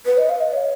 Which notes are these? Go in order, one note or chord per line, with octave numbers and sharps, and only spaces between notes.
B4
D#5
F5
D#5
C#5